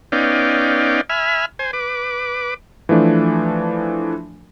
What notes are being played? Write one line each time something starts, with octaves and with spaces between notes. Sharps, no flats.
B3 C#4 D#4 D5 F5 G5
E5 G#5 B5 F6
C5 G#5
B4 D6
E3 F3 A3 D4